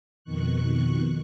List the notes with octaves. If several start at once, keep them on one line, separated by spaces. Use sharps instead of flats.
F2 B2 D#3 C#6 F#6